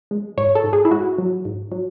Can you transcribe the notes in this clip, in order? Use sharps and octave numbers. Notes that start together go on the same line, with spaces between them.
G#3
G#2 C#5
A4
G#2
G#4
E4
G#2 F#4
F#3
G#2
F#3